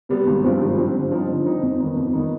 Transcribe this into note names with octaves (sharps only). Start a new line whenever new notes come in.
C3 G3 B3
G#1
G2 F3 C4
G#1
G2 F3 C4
D3
F3 C4 D#4
D3
F3 C4 D#4
F2
D#3 B3 D#4
F2
D#3 B3 D#4